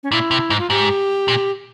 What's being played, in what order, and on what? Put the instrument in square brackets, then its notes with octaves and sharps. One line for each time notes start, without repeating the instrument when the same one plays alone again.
[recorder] C#4
[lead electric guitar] A#2 [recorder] E4
[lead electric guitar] C3
G#2
[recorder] F4
[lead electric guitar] G#2 [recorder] G4
[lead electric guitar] A#2